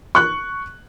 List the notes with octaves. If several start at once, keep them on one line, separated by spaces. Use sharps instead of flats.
C#6 F#6